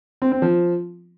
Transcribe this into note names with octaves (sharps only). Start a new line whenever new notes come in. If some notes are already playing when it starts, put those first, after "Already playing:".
C4
C4
F3